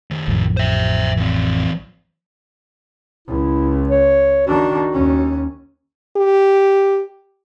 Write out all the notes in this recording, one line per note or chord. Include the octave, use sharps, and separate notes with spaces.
D#3 A3
A1 F2
C5 E5
E3 C4
C#2 E4
C#5
D#3 D4 F#4
D#2 C#4
G4